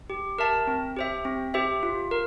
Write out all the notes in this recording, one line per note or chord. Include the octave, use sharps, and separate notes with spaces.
G4
A#4 E5 A5
C4
G4 C5 E5
C4
G4 C5 E5
F4
A#4